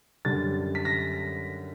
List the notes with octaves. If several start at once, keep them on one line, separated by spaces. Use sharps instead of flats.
F#2 D3 G3 A6
B6
A#6